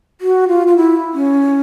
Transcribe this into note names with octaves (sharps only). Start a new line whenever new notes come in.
F#4
F4
F4
E4
C#4